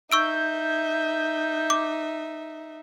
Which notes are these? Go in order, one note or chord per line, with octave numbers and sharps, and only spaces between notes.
D#4 E5 C#6 E6 G6 D7
D6